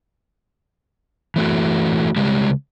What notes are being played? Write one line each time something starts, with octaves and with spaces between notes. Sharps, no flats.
E3 A3 F#4
C#3 G3 G#3